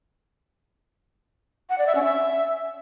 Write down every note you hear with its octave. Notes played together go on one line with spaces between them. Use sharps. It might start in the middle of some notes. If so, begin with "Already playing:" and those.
F#5
D5
E5
C#4
E5